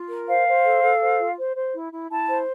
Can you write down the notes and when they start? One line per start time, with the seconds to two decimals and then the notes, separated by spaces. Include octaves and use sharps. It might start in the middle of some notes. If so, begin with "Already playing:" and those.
Already playing: F4
0.10 A#4
0.27 C5 F5
0.46 C5
0.65 A4
0.83 A4
1.01 C5
1.19 F4
1.38 C5
1.56 C5
1.74 E4
1.93 E4
2.11 E4 A5
2.29 C5